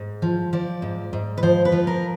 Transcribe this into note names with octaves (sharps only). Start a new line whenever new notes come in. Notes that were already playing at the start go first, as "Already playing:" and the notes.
Already playing: G#2
F3
F3 D5
G#2
G#2
B4
F3 C5
B4
F3
A#4